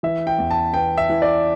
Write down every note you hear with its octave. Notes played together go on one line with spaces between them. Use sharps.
E3 E5
G5
E2
A5
B3 G5
E5
E3
D5